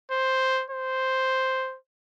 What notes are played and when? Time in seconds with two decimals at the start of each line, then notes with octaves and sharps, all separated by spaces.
0.11 C5
0.71 C5